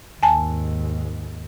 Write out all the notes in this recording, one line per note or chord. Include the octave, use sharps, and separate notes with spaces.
D#2 G#2 G#5 A5